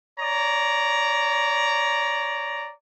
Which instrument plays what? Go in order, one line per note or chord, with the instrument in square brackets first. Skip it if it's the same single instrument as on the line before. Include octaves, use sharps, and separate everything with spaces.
[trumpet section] C#5 D5 A#5